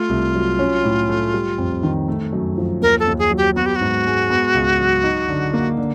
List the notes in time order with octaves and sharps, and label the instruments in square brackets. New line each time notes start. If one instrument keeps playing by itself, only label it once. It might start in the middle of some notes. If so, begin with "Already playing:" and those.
Already playing: [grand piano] A3 [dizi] F4
[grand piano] C2
F#3
C#4
A2
A3
G3
F2
D#3
A3
F#2
F3
[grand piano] D#2 [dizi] A#4
[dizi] A4
[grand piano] D#2
[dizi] G#4
[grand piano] F#3
[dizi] G4
[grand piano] B3 [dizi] F#4
[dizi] G4
F#4
[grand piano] G#2
G#3
B3
C#2
F#3
D#4
D3
A#3
D3